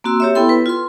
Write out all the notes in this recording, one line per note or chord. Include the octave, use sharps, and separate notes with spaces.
A#3 C4 F#4 C6 E6
G4 C#5 E5
B3 E4 A4 G5 C6
B4
F4 C6